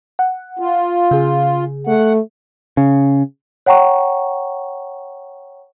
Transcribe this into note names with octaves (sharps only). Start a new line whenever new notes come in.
F#5
F4
C#3 G#4
A3 F#5
C#3
C#5 F#5 G5 A#5 C#6